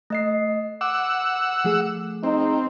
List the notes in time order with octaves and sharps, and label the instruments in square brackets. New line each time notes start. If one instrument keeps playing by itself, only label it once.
[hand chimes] A3 D#5 C7
[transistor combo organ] F#5 E6 [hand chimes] D6
[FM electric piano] F3 A3 G#4
[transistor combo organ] C4 [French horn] D#4